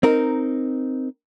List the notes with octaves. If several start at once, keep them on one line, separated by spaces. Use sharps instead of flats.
C4 D#4 A#4